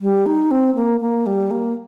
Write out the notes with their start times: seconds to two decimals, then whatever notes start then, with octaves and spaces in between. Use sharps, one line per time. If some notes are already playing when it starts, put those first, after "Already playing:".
0.01 G3
0.26 D#4
0.51 C4
0.75 A#3
1.01 A#3
1.26 G3
1.51 A#3